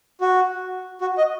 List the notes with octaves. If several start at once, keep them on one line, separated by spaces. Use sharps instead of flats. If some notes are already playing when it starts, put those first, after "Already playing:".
F#4
F#4
D#5